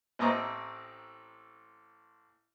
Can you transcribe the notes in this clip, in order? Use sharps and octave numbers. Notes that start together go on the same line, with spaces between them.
A1 A2 C4 D#5 A#5 D6